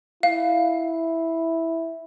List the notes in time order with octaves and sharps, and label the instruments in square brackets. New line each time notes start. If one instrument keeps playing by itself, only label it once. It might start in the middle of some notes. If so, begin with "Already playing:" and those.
[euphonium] E4 [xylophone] F5